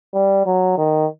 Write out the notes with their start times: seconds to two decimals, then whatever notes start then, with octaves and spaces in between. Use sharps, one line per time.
0.14 G3
0.46 F#3
0.78 D#3